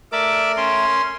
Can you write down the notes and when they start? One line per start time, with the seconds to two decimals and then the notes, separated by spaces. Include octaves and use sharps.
0.12 A3 A#4 D5 E5 D6
0.57 C#4 C6